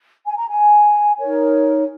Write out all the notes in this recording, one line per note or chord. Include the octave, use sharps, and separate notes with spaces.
G#5
A#5
G#5
D#4 A#4 C#5